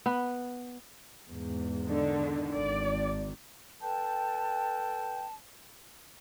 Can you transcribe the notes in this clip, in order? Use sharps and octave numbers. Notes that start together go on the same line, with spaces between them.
B3 B4
E2 G#2
D3 D#3
G#1 D#3 D5
A4 B4 G5 A5